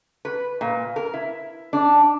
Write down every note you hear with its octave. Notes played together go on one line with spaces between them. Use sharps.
B4
A#2
A#4
E4
D4